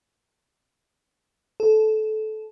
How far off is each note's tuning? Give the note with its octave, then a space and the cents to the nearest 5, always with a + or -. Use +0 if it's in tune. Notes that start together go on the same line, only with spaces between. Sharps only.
A4 -20